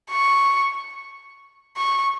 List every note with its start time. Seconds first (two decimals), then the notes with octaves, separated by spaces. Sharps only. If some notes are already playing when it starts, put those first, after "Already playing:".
0.10 C#6
1.77 C#6